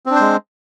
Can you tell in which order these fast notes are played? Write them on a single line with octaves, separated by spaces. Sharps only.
C4 D4 C5 G#3